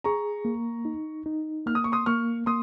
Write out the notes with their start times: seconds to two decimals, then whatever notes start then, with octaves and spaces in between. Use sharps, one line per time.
0.04 G#4 A#5 C#6
0.45 A#3
0.85 D#4
1.26 D#4
1.66 A#3 F6
1.75 D#6
1.84 C#6
1.92 C6 D#6
2.06 A#3 C#6 F6
2.46 A#3 C6 D#6